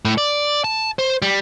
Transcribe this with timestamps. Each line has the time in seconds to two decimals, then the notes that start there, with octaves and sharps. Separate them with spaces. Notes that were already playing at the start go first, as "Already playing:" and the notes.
0.05 A2
0.18 D5
0.64 A5
0.99 C5
1.22 G3